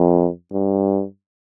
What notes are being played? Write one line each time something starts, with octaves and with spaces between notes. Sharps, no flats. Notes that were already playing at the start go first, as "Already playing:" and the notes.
Already playing: F2
G2